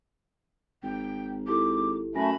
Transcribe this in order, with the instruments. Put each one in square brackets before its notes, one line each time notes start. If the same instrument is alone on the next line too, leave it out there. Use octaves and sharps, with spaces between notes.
[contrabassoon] G#1 [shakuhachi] G5
[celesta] E4 G4 A4 [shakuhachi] D6
[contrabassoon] F#2 [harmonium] A3 [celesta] G#5 A#6 [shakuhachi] B5